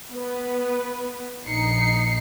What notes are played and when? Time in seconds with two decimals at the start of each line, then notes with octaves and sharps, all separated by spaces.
0.12 B3 B4
1.46 A#1 D#4 C7 C#7